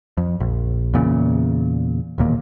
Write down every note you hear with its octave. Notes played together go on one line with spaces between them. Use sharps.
F2
A#1
E2 A#2 C#3
E1 D#2 A#2